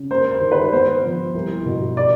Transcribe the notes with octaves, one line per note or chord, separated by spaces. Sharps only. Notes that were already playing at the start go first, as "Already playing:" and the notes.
Already playing: C#3
A#3 C5
C5
D#3
B4
B3 C5
F3
C2
B2
D5